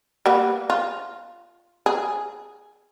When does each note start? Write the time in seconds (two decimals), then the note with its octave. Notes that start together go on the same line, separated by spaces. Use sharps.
0.26 G3 A#3 B3
0.70 F4
1.86 G#4